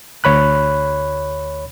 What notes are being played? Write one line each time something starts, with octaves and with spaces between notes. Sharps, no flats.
D2 C#5 B5 F#6